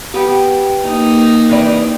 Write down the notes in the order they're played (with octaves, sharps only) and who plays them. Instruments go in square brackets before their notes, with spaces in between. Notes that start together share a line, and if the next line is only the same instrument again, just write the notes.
[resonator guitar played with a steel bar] B3 G4
[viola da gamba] A#3 D#4
[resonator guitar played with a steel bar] C3 E3 D5